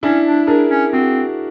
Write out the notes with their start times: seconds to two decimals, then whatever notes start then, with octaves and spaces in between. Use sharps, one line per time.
0.03 C#4 D4 E4
0.26 D4
0.47 D4 G#4 A#4
0.70 C#4
0.93 C4 F#4 G#4